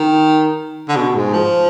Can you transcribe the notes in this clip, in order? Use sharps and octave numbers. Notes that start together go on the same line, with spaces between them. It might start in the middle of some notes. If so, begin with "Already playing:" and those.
Already playing: D#3
D3
B2
G#2
F3